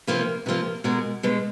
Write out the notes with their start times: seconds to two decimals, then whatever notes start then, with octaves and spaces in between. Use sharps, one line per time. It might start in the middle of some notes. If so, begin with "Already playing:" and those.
0.07 C3 F3 A#3 B4
0.46 C3 F3 A#3 B4
0.84 B2 G#3 A#4
1.23 B2 G#3 B4